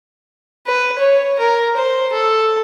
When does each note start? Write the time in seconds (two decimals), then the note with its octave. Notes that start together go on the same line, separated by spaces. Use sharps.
0.67 B4
0.99 C#5
1.39 A#4
1.77 C5
2.13 A4